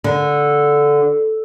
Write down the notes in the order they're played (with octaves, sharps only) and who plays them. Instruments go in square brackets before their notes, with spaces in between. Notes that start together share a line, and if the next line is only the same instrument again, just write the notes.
[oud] D3